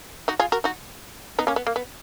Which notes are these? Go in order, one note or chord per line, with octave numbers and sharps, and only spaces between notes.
D#4 F#4
F4 G#4
F#4 A#4
D#4 F#4
B3 D#4
A#3 C#4
B3
A#3
B3